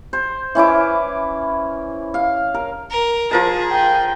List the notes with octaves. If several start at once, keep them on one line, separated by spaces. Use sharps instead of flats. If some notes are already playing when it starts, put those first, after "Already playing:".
C5
E3 C#4 E4 D6
F5
A#4
A#4
F3 G#4 A#4 A5
G5